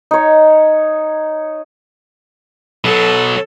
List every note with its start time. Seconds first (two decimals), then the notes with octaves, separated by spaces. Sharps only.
0.11 D#4 C#5
2.84 B2 F#3 A4